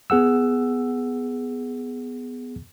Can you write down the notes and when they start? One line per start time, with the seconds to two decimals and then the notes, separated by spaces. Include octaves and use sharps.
0.10 B3 G#4 F#5 E6